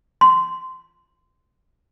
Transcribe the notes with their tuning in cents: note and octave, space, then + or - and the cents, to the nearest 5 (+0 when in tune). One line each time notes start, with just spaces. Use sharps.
C6 -15